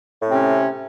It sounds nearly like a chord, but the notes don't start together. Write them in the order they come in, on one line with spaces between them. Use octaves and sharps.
A2 C4 C3 C#4